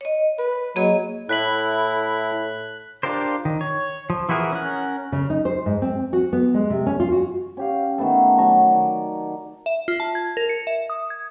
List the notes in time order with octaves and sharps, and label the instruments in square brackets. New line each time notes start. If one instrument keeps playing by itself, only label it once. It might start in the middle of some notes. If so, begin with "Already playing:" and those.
[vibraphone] C#5 D#5
[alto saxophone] B4 [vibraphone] B5
[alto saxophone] F#3 [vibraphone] A#3 G#4 D#5
[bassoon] A2 [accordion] E4 [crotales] F#6 B6 F#7
[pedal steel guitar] D4 F4 G4 A#4 C5
D#3
C#5
F3
E3 E4 F#4 G#4 A#4
C#4 A#4 F#5
[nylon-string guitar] C#3
D#4
C5
G#2
C4
F#4
B3
G#3
C3
C#4
F4
F#4
[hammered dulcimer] C#4 G4 F5
D#3 A3 B3 A4
F#3 A5 A#5 C#6
D#3 D5
[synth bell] E5
F4
A5
G#6
A#4
C#7
E5
D#6
G#6